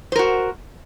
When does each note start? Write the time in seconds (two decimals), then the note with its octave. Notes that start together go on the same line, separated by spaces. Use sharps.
0.12 C5
0.16 A#4
0.19 F#4